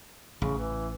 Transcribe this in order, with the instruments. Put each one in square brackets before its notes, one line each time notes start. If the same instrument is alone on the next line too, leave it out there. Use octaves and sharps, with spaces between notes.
[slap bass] A1 [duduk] C#3
[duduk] E3